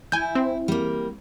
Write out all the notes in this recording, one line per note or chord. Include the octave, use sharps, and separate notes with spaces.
E4 G#5 G6
C4
G3 A#3